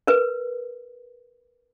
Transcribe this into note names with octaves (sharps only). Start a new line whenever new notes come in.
A#4 B4